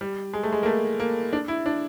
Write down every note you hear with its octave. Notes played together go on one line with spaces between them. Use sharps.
G3
G#3
A3
G#3
A#3
A3
A#3
D4
E4
D4